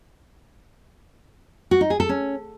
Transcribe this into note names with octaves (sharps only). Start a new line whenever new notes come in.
F#4
D#4
G#4
A4
C#4